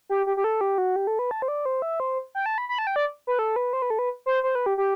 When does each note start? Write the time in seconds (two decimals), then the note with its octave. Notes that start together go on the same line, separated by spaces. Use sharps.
0.09 G4
0.26 G4
0.37 G4
0.44 A4
0.61 G4
0.78 F#4
0.96 G4
1.07 A4
1.19 B4
1.31 A5
1.42 C5
1.48 D5
1.65 C5
1.82 E5
2.00 C5
2.35 G5
2.46 A5
2.58 B5
2.69 B5
2.79 A5
2.87 G5
2.96 D5
3.27 B4
3.39 A4
3.56 B4
3.73 C5
3.82 B4
3.90 A4
3.99 B4
4.26 C5
4.43 C5
4.55 B4
4.66 G4
4.78 G4